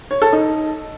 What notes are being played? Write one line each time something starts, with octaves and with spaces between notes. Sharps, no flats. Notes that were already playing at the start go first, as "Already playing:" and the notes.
C#5
A4
D#4